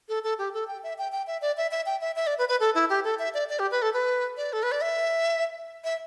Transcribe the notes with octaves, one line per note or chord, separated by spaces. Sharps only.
A4
A4
G4
A4
G5
E5
G5
G5
E5
D5
E5
E5
G5
E5
E5
D5
B4
B4
A4
E4
G4
A4
E5
D5
D5
G4
B4
A4
B4
D5
A4
B4
D5
E5
E5